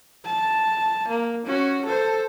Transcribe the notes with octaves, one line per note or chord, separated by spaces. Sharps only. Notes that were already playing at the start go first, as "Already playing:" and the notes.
A5
A#3
C#4 F#4
A4 C5